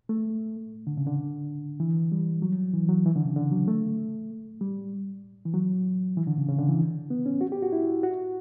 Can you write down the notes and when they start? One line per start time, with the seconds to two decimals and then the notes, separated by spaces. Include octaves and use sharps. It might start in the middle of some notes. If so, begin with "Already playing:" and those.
0.09 A3
0.87 D3
0.97 C#3
1.07 D3
1.80 E3
2.12 G3
2.42 F#3
2.73 E3
2.89 F#3
3.06 E3
3.16 D3
3.25 C#3
3.36 D3
3.51 F#3
3.68 A3
4.61 G3
5.46 E3
5.54 F#3
6.17 E3
6.27 D3
6.38 C#3
6.48 C#3
6.58 D3
6.69 E3
7.10 B3
7.26 C#4
7.41 F#4
7.52 G4
7.63 F#4
7.72 E4
8.03 F#4